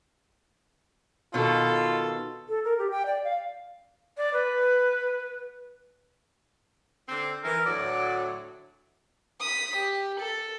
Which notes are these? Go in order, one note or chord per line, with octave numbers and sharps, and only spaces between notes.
B2 D#3 F4 A4
A4
A#4
G4
G5
D5
F5
D5
B4
D3 C4
E3 A#4
D2 A2 F#3 D5
D#6 B6
G4
A4